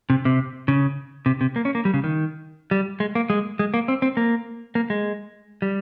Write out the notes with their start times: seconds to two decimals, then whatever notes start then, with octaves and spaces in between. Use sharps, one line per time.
0.10 C3
0.25 C3
0.68 C#3
1.26 C3
1.41 C3
1.56 A#3
1.65 C#4
1.75 A#3
1.85 G3
1.94 C#3
2.04 D#3
2.71 G3
3.00 G#3
3.15 A#3
3.30 G#3
3.59 G#3
3.74 A#3
3.88 C4
4.02 C4
4.17 A#3
4.75 A#3
4.90 G#3
5.62 G3